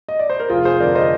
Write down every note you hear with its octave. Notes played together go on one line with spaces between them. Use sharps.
D#5
D5
C5
A#4
F1 F4 G#4
G#4 C5
F2 D3 A#4 D5
C5 D#5